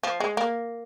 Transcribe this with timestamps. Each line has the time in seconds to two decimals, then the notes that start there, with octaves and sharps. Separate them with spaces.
0.03 F3
0.20 G#3
0.37 A#3